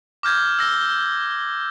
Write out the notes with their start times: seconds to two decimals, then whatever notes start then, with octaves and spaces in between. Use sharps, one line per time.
0.23 D6 F6 G6 G#6
0.59 E6 A#6 G7